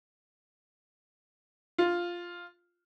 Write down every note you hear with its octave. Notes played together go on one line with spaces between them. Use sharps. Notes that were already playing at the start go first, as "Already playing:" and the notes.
F4